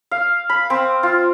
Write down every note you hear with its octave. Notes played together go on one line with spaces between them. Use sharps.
F5
B5
C4
F4